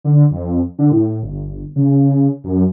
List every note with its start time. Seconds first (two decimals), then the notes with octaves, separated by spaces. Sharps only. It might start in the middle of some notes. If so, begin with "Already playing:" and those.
0.04 D3
0.31 F2
0.79 D3
0.91 A2
1.23 G1
1.76 C#3
2.44 F#2